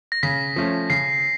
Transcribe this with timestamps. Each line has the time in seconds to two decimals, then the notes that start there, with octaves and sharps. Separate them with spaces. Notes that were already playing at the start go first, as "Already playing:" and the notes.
0.12 A#6
0.23 C#3 B6
0.56 F3 A3 C#4
0.90 C#3 C7